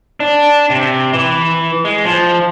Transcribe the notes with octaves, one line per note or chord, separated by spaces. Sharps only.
D4
C3
E3
G#3
F3